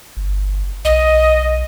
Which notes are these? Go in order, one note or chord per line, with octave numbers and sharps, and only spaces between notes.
G1
B1 D#5